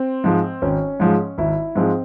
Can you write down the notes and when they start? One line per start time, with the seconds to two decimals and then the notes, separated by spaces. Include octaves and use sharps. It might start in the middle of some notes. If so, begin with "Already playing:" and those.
Already playing: C4
0.24 G#2 F3 G#3
0.62 G#1 C#4
1.00 G#2 F3 G#3
1.38 G#1 E4
1.75 G#2 F3 G#3 C4